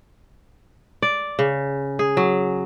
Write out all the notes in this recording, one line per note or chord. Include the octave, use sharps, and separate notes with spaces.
D5
C#3
G#4
F#3